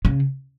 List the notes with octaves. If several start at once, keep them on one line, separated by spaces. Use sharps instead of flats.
C#3